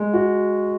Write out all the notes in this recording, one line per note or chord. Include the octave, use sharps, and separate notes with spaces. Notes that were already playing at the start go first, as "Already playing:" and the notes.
Already playing: G#3
F#4